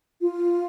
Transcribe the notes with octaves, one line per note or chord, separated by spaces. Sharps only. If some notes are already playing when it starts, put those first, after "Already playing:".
F4